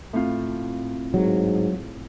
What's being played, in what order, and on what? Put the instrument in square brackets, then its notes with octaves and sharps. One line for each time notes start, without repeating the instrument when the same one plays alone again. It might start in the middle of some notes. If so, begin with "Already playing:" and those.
[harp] A2 C4 F4
[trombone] G#2 [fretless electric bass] F#3